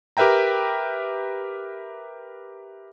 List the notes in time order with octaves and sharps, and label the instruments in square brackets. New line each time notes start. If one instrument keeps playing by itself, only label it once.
[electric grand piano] G4 A#4 B4 E5 G5 A#5